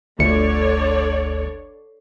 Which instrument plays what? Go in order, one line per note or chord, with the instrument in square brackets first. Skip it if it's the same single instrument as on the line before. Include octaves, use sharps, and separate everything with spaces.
[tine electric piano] G1 D2 C#7 [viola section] D3 C#5 D5